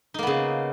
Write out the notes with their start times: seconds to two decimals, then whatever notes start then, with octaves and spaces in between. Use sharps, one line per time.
0.14 D#4
0.19 A#3
0.23 B3
0.27 C#3